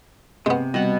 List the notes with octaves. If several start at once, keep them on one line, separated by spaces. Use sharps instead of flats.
C3 G#3 B3
B2 G3 F#5